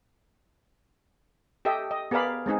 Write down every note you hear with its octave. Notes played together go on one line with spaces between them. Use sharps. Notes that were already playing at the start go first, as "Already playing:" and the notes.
G4 A4 D#5 E5 G5
D#5
B3 G#4 A#4 D5 F5 B5
G#3 C4 D#4 G#4